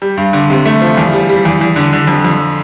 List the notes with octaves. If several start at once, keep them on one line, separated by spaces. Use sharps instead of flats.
G3
G2
D3
C3
A3
F3
E2
G3
G3
E2
E2
D3
D3
F2
F2